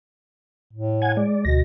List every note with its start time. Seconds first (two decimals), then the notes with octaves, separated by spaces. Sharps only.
0.73 A2
1.02 F#5 G#5 G#6
1.17 G#3 D5
1.45 D2 B2 A#6